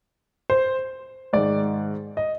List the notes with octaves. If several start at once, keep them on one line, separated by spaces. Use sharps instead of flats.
C5
G#2 D#3 D5
D#5